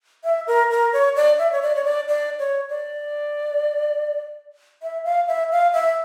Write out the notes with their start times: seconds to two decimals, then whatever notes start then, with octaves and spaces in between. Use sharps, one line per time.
0.24 E5
0.47 A#4
0.71 A#4
0.93 C#5
1.16 D5
1.39 E5
1.52 C#5
1.62 D5
1.75 C#5
1.84 D5
2.08 D5
2.39 C#5
2.69 D5
4.82 E5
5.05 F5
5.28 E5
5.51 F5
5.73 E5